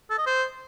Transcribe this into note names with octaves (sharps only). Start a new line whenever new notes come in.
A4
D#5
C5